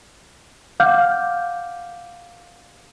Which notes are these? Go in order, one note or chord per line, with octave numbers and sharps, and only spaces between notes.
F5 F#5 D6 F6 G6